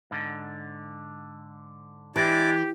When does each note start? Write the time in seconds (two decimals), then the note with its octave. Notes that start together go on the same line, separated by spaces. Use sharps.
0.11 G#2 D3
2.16 E3 G#3 D4 E4 G4 D5 D6